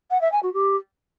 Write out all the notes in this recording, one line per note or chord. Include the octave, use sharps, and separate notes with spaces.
F#5
E5
G#5
F#4
G4